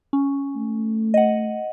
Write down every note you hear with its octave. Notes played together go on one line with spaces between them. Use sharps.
C#4
A3
D#5 F#5